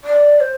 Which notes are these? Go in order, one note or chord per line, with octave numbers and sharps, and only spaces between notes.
D5
C5